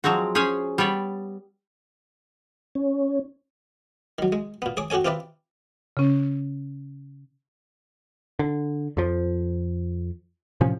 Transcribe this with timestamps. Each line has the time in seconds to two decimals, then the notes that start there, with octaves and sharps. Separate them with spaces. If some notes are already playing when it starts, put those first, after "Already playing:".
0.04 F3 F#3 G#3 C4 F#4
0.35 C#4 G#4 C5 C#5 G#5
0.78 G3 B3 C#5 D5
2.75 C#4
4.19 D#3 F#3
4.32 G#3
4.62 A#2 B3
4.77 G#4 C#5 D6
4.90 F#4 G4 A4 C#5 G#5
5.05 C4 F4 G4 B4 D5 E5
5.97 C#3 C#4
8.39 D3
8.97 F2 F3
10.61 A2 C3 F3 C#4